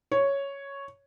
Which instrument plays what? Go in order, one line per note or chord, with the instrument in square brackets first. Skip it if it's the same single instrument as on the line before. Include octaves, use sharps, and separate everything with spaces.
[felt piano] C#5